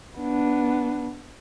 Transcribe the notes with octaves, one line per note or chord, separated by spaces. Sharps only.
B3 D4